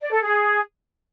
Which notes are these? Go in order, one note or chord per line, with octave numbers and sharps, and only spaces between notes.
D5
A4
G#4